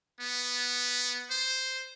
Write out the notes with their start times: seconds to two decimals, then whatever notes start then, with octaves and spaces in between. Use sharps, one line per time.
0.20 B3
1.30 C5